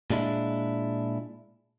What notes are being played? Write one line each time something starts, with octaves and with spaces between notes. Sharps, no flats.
A#2 G#3 D4 E4